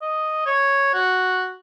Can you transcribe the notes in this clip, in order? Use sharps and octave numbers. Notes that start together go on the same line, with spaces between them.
D#5
C#5
F#4